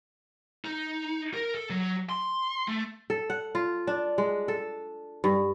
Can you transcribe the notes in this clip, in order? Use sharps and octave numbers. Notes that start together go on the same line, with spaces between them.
D#4
A#4
A4
F#3
C6
A3
A4
F#5
F4
D4
G#3
A4
G2